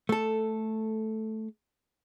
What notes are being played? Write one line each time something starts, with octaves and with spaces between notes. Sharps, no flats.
A3 A4